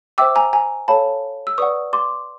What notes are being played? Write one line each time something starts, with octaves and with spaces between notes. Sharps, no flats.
C5 E5 G5 D6 E6
G#5 A#5
G#5 A#5
A4 C#5 F5 A5 B5
E6
B4 D5 F#5 C#6 D#6
C6 D6